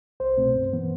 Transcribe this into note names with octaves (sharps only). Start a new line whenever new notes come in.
C2 C5
B2 A3 C4
G2
E3 B3